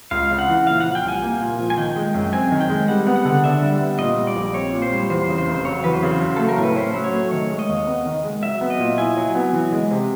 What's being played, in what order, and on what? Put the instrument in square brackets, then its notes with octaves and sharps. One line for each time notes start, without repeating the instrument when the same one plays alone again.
[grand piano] C#2 [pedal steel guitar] F5
[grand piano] C#3
[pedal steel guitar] F#5
[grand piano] E3
[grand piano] A#2 [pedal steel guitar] F5
[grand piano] F3 [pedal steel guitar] F#5
[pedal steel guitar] G5
[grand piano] C2 [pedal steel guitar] G#5
[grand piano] A#3
A#2
F3
[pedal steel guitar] G#5
[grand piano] D#3 [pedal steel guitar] G5
[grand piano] G#3
F#2
[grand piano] C4 [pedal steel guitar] G#5
[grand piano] D#3
[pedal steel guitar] G5
[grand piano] G#3
[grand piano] G3 [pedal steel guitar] F#5
[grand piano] B3
[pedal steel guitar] F#5
[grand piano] D3
[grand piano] D4 [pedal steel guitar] E5
[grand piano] G3
B3
[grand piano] A#2 [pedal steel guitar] D#5
[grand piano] G3
[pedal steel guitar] D5
[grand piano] A#1
[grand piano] C4 [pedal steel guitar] C#5
[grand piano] A#2
[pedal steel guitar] C5
[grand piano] G3
[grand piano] E2 [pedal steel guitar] C5
[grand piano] C#3
[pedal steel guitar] C5
[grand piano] F1
[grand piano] F#3 [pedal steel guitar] C#5
[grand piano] E2 [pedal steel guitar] B4
[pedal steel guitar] C5
[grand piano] C#3
F#3
[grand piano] A3 [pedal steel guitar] A4
[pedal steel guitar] A#4
[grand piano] A2 [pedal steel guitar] B4
[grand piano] C#4 [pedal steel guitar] C5
[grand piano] F#3
[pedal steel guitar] C#5
[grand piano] A3
[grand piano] D#3 [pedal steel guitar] C#5
[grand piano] G#3
[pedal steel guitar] D#5
[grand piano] D#2
B3
D#3
G#3
[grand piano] F#3 [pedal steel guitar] E5
[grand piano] B3
[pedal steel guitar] D#5
[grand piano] A#2
[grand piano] E4 [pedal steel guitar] G#5
[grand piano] F#3
B3
E3
G#3
C3